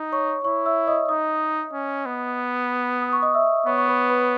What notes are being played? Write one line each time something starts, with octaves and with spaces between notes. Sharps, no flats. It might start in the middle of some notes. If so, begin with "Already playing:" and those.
Already playing: D#4
C#5 C#6
E4 C#5 C#6
E5 E6
D#5 D#6
D#4 D#5 D#6
C#4
B3
D#6
C#6
D#5 D#6
E5 E6
B3 C#5 C#6
C#6
B4 B5
B4 B5